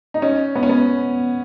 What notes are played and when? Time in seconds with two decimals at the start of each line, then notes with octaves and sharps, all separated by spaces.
0.14 D#4
0.22 C#4
0.55 B3
0.63 C#4
0.69 B3